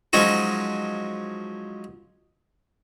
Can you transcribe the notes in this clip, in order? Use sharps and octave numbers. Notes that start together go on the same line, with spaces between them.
F3 F#3 G#3 C#4 D#4 F#4